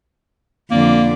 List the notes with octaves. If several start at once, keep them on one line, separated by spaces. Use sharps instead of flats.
F2 D3 A#3 D5